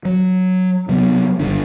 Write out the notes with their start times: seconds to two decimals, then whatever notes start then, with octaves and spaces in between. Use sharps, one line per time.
0.05 F#3
0.89 C3 F#3 B3
1.39 F#1 G2 D3 D4